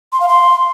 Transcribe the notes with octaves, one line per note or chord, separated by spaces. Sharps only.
C6
F5
C6